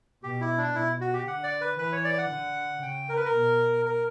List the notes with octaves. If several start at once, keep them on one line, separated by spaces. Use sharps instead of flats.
B2 G4
E4
D4
B2 E4
F#4
G4
D3 F#5
D5
B4
E3 B4
C#5
D5
F#5
D3
C#3 G5
A#4
B4
A#4
B2
A#4